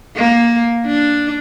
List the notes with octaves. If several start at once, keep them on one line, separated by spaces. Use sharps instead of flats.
A#3
D4